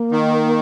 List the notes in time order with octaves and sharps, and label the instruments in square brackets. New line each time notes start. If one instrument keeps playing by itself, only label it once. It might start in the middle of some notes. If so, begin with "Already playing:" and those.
Already playing: [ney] A#3
[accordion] D#3